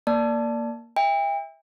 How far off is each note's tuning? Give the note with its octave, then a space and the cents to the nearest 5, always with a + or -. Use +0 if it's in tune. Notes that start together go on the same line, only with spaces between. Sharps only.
A#3 +0 D5 +0 A5 +0
E5 -15 G5 +40